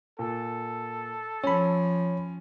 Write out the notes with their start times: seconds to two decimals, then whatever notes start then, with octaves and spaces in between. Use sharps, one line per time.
0.19 A#2 A4
1.44 F3 C#4 C#5 B5